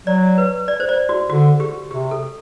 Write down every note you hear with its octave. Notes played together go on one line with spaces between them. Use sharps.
F#3 D5
B4
D5
C5
D5
F#4
D3 F#4
G4
C3 G4
A4